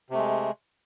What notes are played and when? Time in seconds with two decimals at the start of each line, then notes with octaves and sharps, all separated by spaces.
0.10 C3
0.14 A3
0.18 G#3